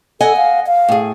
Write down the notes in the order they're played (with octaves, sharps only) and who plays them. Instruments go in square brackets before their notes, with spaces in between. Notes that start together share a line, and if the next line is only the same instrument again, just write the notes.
[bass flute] A4 [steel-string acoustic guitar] D#5 F#5 G#5
[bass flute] F5
F5
[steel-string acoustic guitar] A2 G#4